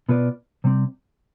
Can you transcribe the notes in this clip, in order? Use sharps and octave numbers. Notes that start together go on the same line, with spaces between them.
B2 B3 F4 B4 D5
C3 G3 C4